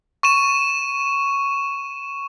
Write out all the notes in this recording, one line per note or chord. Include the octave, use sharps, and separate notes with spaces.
C#6 D#7 E7